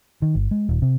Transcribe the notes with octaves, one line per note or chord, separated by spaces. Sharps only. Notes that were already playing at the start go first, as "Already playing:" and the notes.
D#3
G1
G#3
D#1
C3